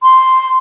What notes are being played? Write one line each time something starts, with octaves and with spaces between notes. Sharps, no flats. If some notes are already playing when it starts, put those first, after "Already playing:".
C6